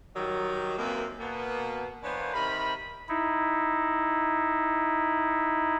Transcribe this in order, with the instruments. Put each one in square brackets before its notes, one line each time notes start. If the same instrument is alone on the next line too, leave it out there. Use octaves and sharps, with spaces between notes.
[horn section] D#3 F#3 G3
F#2 C3 D#3 A#3 C4 B4
B2 A#3 B3
E3 A#3 B3 D4 C5 C#5
C3 D#3 A#4 B5
[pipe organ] D#4 E4